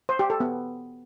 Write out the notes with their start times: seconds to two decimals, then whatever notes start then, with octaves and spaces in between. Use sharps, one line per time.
0.09 C5
0.19 G4
0.30 A4
0.40 B3